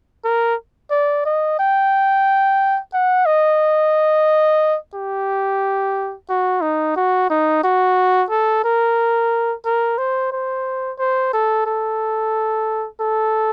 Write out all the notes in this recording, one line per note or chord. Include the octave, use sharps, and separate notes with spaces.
A#4
D5
D#5
G5
F#5
D#5
G4
F#4
D#4
F#4
D#4
F#4
A4
A#4
A#4
C5
C5
C5
A4
A4
A4